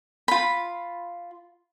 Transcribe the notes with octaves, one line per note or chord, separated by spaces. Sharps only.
F4 B5